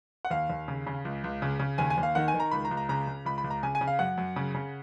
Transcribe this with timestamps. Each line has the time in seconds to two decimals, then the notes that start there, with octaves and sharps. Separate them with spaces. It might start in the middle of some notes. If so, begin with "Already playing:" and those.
0.25 F#5
0.30 D#2 F5
0.50 D#2
0.68 C#3
0.87 C#3
1.05 C#2
1.24 C#2
1.42 C#3
1.59 C#3
1.78 D#2 G#5
1.90 G#5
1.97 D#2
2.03 F5
2.15 D#3 F#5
2.28 G#5
2.34 D#3
2.40 A#5
2.51 C#2 B5
2.65 A#5
2.71 C#2
2.77 A#5
2.89 C#3 A#5
3.07 C#3
3.25 C#2 B5
3.38 B5
3.44 C#2
3.50 A#5
3.63 C#3 G#5
3.75 G#5
3.81 C#3
3.87 F5
3.99 F#2 F#5
4.17 F#2
4.36 C#3
4.55 C#3